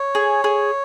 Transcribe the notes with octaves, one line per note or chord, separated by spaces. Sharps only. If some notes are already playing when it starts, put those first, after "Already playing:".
Already playing: C#5
G#4
G#4